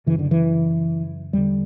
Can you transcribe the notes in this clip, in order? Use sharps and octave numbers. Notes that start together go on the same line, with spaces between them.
F#2 C#3 E3
D3
E3
E2 D3 G3